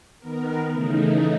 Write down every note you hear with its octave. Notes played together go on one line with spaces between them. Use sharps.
D#3 B3 A#4
C#3 E3 A3 D#4